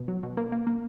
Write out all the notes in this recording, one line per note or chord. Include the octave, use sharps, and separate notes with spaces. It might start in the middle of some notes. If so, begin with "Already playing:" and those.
Already playing: B2
F#3
B2
A#3
A#3
A#3